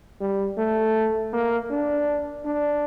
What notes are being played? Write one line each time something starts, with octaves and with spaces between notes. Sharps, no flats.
G3
A3
A#3
D4
D4